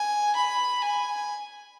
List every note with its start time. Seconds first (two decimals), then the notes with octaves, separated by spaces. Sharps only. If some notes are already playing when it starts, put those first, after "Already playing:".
Already playing: G#5
0.35 B5
0.83 G#5